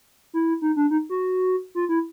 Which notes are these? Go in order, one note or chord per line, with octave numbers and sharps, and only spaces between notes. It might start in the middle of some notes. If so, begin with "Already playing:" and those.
E4
D#4
D4
D#4
F#4
F4
E4